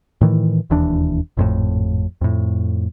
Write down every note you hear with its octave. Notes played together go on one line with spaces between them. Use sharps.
A2 D#3 E3
E1 D#2 E3 D4
G#1 F2 A2
F2 A2